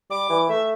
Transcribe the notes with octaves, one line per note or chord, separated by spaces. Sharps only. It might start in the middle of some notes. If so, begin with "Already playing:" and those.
G3 D6
E3
A3 E5